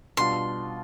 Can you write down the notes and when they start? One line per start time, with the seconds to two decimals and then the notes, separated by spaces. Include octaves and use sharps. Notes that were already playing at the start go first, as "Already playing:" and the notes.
0.17 B2 G3 D4 F4 C6